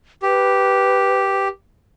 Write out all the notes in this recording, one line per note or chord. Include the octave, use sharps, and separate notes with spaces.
G4 B4